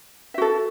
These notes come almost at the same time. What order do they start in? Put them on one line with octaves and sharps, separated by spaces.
E5 F#4 A4